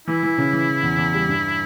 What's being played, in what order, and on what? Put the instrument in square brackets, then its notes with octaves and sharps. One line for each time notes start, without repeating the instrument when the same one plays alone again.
[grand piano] E3 [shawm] E4
[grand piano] E3
C#3
E3
E3
E2
E2
G3
G2